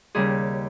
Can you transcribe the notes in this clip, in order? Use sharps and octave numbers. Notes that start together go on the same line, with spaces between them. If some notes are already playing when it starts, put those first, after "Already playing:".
D#2 C#3 G3 G#4